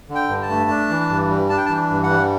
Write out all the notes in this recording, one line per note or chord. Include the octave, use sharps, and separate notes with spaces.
D3
G5
G2
A5
A3
D4
E3
G2
G3
D4 A5
G5
A5
E3
G2
F#5
G3